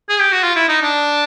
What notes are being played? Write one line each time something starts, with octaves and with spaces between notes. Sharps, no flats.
G#4
G4
F#4
F4
E4
D#4
D4